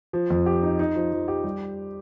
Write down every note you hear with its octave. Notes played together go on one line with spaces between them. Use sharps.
F3
F2
G4
D#4
D#4
F3
F3
G4
G3